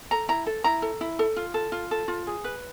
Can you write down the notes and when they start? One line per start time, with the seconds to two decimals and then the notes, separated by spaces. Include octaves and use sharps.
0.11 A4 A#5
0.29 E4 A#5
0.46 A4
0.64 E4 A#5
0.82 A4
1.01 E4
1.19 A4
1.36 F4
1.54 A4
1.72 F4
1.91 A4
2.08 F4
2.27 G#4
2.44 B4